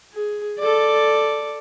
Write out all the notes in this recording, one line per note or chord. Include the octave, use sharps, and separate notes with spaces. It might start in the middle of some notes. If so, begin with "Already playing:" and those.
G#4
A4 D5